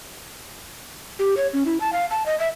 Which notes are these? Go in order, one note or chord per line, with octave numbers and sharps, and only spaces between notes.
G4
C#5
C#4
E4
A5
F5
A5
D#5
E5